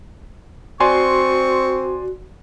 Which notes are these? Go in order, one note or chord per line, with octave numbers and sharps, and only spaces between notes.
C4 F#4 D5 G#5 C6 C#6